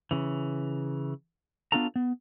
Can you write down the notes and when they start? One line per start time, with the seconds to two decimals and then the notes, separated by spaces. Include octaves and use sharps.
0.11 C#3 E3
1.72 B3 D4 F4 F#4 A4 A#5
1.96 B3